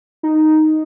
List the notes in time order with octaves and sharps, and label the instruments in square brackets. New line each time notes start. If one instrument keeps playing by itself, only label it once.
[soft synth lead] D#4